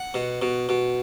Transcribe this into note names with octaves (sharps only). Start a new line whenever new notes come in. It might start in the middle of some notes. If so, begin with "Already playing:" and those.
Already playing: F#5
B2
B2
B2